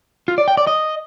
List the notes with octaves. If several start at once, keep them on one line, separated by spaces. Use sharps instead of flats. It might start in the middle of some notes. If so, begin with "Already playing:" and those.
F4
D5
G5
D5
D#5